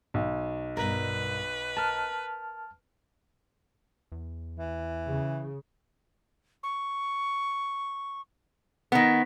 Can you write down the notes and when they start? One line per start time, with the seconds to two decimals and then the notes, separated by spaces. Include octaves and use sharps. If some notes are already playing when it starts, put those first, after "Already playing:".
0.14 B1
0.77 G2 B2 A#4 B4
1.77 A#4 A5 F6
4.12 E2
4.59 E3
5.06 C#3
6.63 C#6
8.92 D#3 B3